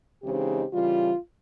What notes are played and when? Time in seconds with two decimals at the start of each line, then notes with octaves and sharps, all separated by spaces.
0.23 C#3 E3 G#3 C4 D#4 G4
0.72 C#3 E3 G3 F4